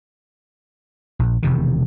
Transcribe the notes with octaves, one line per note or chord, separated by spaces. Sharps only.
A#1
E1 C3 D#3